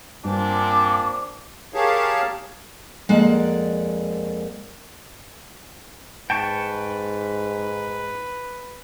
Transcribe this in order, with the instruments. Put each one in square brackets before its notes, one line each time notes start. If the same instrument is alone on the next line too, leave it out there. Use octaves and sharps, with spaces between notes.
[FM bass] G2 [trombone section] A#2 C4 D4 [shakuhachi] D6
[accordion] G4 G#4 A#4 C#5 F5 A5
[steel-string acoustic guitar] F2 G#3 A#3 A#4 D5 F#5
[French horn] G#2 [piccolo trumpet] B4 [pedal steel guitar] G5 A5 C#6